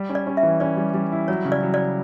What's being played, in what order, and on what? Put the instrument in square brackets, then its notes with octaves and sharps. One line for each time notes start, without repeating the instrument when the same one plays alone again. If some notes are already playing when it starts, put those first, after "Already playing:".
Already playing: [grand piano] G3
C#4
[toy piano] D5
[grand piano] C#4
[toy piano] E5
[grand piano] E3
[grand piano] C#4 [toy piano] D5
[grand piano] G3
G3
E4
[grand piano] F#3 [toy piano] C#5
[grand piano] C#3
[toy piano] D5
[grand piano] F#3
[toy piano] D5